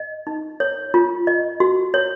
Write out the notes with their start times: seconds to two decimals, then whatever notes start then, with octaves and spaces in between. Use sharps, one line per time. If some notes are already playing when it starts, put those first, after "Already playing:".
Already playing: D#5
0.27 D#4
0.60 C#5
0.94 F4
1.27 D#5
1.60 F#4
1.94 C#5